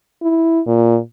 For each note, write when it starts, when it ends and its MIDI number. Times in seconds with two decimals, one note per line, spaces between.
0.22 0.60 64
0.67 0.98 46